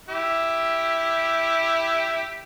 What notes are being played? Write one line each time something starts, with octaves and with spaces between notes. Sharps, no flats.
E4 G4